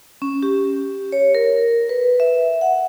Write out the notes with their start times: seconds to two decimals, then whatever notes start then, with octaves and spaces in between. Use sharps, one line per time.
0.22 C#4
0.43 G4
1.12 C#5
1.35 A#4
1.89 B4
2.20 E5
2.61 F#5